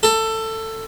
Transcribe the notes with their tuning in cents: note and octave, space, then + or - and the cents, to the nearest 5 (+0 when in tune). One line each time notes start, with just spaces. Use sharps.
A4 +15